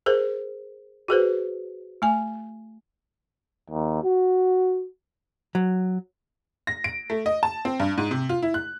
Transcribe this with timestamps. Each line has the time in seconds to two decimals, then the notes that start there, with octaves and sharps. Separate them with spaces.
0.06 G#4 A#4 C5
1.08 F#4 G#4 B4 C5
2.02 A3 G#5
3.70 D#2
4.04 F#4
5.55 F#3
6.67 A#6
6.84 D7
7.10 A3
7.26 D#5
7.43 A5
7.65 C4
7.80 G2
7.98 G#2
8.11 C3
8.29 F4
8.42 E4
8.54 F#6